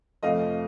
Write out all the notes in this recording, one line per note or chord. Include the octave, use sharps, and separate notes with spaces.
F2 C3 F3 A3 D#5 F5